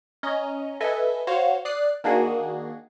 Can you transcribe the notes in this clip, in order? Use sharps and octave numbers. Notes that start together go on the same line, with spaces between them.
C#4 D#5 A#5
A4 B4 D#5 E5 G#5
F#4 C5 C#5 F5
D5 D#6 F#6 C7
D#3 A#3 D4 F#4 G#4